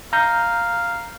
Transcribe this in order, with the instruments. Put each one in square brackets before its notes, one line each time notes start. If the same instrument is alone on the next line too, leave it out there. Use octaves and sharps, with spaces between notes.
[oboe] F5 [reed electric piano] A#5 G6